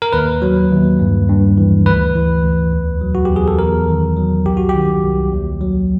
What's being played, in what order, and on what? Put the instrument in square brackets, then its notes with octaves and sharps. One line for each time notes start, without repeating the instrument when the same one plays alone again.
[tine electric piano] A#4
D#2 B4
F#3
D#2
G2
G2
E3
D2 B4
E3
D2
E2
F#3
F#4
E2 G4
G#4
A4
E2 A#4
D#3
F#3
C2 G4
F#4
D#3 G4
C2
D#2
F#3